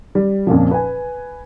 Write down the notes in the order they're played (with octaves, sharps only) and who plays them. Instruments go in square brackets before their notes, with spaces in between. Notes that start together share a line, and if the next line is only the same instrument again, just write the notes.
[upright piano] G3
F2 A#2 C#3 F3
B4 G#5